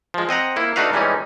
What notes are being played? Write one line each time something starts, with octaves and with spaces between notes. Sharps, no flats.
F3 G#3
C4 D#5 F#5 A#5
A#3 E4
A3 D4 D#4 F#4 B4 F5
E3 G3 G#3 C#4 D#4